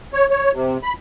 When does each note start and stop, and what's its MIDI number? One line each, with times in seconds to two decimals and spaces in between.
0.13 0.26 73
0.30 0.51 73
0.53 0.78 48
0.83 0.93 83